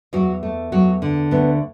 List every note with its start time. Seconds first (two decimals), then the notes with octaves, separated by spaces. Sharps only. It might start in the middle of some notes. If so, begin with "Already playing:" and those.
0.13 E2 F#3 F#4
0.43 A3
0.72 E2 F#3 F#4
1.02 D3
1.31 D2 B3